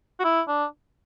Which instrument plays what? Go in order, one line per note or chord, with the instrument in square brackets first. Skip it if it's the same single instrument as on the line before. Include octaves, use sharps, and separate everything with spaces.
[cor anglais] F#4
E4
D4